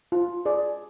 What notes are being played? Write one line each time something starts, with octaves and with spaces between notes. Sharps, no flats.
F4
G#4 D5